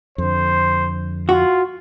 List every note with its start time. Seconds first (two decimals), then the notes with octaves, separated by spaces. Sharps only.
0.18 F2 D3 C5
1.29 F4 F#4